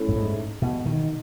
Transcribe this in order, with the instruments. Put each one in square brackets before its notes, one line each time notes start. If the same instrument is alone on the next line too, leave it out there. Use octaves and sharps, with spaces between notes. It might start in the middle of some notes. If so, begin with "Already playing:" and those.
Already playing: [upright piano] A3 C#4 E4
[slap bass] A2
G#2
B2
D#3